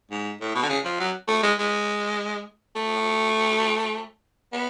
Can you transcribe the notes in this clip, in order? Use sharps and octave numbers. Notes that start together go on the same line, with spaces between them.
G#2
A2
B2
D3
C#3
F3
F#3
A3
G#3
G#3
A3
B3